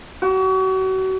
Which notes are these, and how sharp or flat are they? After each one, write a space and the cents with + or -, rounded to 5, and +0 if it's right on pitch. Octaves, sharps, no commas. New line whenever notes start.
F#4 +35